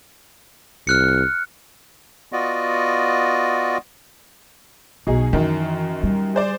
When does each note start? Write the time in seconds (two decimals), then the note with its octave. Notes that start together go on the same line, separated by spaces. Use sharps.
0.87 C2 F6 F#6 C#7
2.33 B3 F4 F#4 D5 D#5
5.07 B1 B2 D#4 G#4
5.33 F#2 D#3 E3
6.03 G3
6.35 G#4 C5 D5